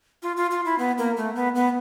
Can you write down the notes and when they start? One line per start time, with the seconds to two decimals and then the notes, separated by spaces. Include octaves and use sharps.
0.22 F4
0.37 F4
0.51 F4
0.65 E4
0.79 B3
0.98 A#3
1.17 A3
1.35 B3
1.55 B3